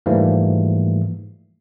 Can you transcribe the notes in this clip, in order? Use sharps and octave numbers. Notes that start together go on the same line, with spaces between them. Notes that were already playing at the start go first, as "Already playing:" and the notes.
G#2 E3 F3 G3 A3 A#3